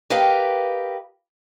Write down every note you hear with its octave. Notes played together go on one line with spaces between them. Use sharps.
G4 A#4 B4 D#5 F5 G5